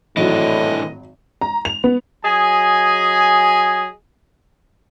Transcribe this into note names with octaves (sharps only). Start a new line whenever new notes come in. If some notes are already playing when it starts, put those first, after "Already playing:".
G#1 A2 E3 F#3 D4 D#5
A#5
F7
B3
F#3 G#4 D#5 G#5